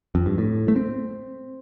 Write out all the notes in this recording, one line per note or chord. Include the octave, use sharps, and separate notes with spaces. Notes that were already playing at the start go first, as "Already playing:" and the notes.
F2
G2
A2
A3
C4